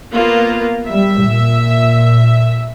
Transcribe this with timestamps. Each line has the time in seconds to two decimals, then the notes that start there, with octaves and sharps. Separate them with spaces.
0.13 A#3 B3 F4
0.89 G3 E5
1.28 A#2